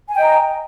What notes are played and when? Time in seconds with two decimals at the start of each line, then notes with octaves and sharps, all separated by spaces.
0.09 G#5
0.14 G5
0.18 D#5
0.22 A#5